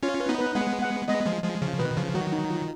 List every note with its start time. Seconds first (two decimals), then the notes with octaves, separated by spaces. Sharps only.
0.03 C#4 F4 C#5
0.20 B4
0.29 B3 D#4
0.38 B4
0.55 G#3 B3 F#5
0.82 F#5
1.08 G#3 B3 D#5
1.26 F3 G#3
1.43 F3 G#3
1.62 C#3 F3
1.79 B2 D#3 B4
1.97 C#3 F3
2.14 D#3 F#3 F#4
2.32 D#4
2.50 F4